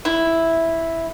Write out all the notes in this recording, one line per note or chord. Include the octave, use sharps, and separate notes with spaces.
E4